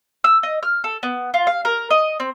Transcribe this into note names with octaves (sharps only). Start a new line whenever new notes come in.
E6
D#5
F6
A4
B3
F4
F5
A#4
D#5
C4